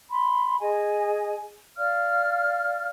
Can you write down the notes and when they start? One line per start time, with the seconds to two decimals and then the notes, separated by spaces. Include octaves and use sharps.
0.11 B5 C6
0.61 G#4 D#5 G#5
1.77 D5 F5 F6